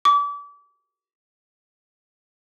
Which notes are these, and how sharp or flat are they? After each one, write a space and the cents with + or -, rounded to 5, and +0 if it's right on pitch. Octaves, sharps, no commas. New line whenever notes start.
D6 -35